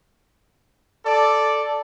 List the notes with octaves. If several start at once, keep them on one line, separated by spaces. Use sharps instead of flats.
A4 D5